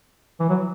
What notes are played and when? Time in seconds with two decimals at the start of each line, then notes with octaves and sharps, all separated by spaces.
0.40 E3
0.49 F#3